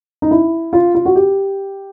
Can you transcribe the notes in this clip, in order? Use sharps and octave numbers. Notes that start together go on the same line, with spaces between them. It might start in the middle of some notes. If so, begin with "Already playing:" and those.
D#4
E4
F4
F4
F#4
G4